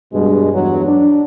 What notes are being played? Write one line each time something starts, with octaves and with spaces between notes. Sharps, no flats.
G2 B2 G#3
E2 G2 B2 F#3
D4